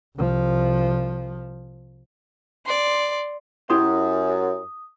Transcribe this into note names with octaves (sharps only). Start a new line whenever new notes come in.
C2 F3
D5 C6
F#2 E4 G4 C6 D#6